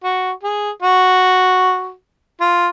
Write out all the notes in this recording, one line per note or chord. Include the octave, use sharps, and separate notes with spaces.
F#4
G#4
F#4
F4